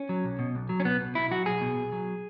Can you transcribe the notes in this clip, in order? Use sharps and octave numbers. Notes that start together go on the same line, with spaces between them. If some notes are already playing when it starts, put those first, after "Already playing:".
Already playing: C#4
F#3
B1
B2
B1
F#3
C#4
B1 B3
B2
B1 E4
F#3 F#4
B1 G#4
B2
B1
F#3